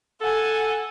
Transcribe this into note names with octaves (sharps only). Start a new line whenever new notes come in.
A4 F#5 G#5